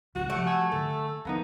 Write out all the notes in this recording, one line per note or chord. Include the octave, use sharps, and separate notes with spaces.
C#2 D#3 F#4
F3 G3 A3 G4 F#5
F#5 G#5 E6
D3 A4
F3 F#3 A#3 B3 D#4